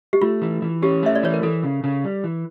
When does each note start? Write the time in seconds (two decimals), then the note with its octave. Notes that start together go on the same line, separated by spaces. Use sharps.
0.13 G4
0.22 A3 F4
0.42 E3
0.62 E3
0.82 C#4 G4
1.03 A3 E5
1.15 D5
1.23 E3 C#5
1.34 A#4
1.43 E3 A4
1.63 C#3
1.84 C#3
2.04 G3
2.24 E3